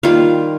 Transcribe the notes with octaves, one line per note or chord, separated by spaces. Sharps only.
D#3 G3 A#3 F4 F5